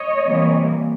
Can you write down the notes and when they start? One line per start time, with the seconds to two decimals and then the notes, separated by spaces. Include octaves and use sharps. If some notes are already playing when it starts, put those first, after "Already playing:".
Already playing: C#5 D#5
0.26 C3 E3 G3 A#3